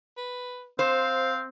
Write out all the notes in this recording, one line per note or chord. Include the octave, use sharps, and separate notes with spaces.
B4
C4 C5 F5